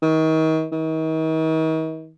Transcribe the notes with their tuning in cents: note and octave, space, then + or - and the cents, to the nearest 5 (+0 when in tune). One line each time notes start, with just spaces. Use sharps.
D#3 +35
D#3 +40